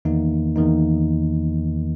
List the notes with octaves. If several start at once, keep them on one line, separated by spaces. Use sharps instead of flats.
E2 D#3 A#3 D#4
E2 D#3 A#3 D#4